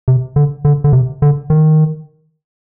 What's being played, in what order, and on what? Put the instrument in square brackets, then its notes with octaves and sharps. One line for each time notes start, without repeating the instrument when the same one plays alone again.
[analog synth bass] C3
D3
D3
D3
C3
D3
D#3